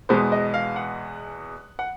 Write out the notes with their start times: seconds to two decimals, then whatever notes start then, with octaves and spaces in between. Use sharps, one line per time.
0.09 E2 B2 G#3 B3 C5
0.32 D#5
0.54 F5
0.76 F#5
1.79 F#5